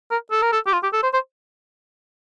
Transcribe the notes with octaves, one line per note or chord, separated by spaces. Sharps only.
A#4
A4
A#4
A4
G4
F4
G4
A4
C5
C5